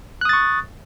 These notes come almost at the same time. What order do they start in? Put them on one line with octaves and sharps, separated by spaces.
F#6 D#6 A6 C#6